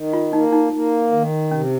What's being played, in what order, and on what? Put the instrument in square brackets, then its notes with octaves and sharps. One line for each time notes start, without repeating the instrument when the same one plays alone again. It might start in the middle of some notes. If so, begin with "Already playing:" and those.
Already playing: [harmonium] D#3
[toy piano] F4
[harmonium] A#3 [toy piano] D#4
[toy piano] D#4
[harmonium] A#3
D#3
[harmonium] C3 [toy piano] C#4